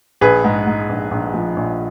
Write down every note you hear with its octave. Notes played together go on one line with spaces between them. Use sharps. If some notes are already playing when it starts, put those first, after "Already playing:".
A#1 G#4 B4
G#2
G#2
A#1
A#1
F3
A#1